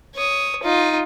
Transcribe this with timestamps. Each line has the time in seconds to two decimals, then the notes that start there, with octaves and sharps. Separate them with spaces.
0.15 C#5 D#6
0.63 D#4 F4